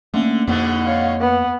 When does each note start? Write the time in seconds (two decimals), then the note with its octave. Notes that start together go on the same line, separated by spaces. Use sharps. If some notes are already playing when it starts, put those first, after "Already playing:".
0.14 D3 A3 A#3 C#4
0.47 F2 G#2 B2 D3 A#3 C4
0.85 C#5 F5
1.20 B3